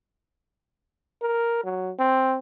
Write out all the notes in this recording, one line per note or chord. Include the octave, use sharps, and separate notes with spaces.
A#4
F#3
C4